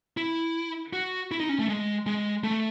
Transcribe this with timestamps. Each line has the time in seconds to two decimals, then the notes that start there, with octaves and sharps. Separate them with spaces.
0.17 E4
0.93 F#4
1.31 E4
1.40 D#4
1.49 C#4
1.59 A3
1.69 G#3
2.06 G#3
2.43 A3